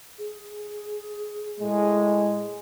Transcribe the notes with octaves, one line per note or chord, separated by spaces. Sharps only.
G#4
A2 G#3